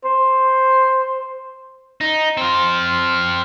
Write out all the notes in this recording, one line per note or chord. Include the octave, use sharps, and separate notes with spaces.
C5
D#4
C4 F4